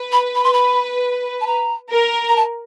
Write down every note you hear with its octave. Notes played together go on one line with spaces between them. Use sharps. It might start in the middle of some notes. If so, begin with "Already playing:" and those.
Already playing: B4
B5
B5
C6
B5
A5
A#5
A#4
A#5
A5